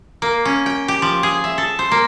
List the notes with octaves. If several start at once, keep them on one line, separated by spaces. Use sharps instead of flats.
A#3
C#4
G5
G4
F3
G#4
E5
A4
C5
A#3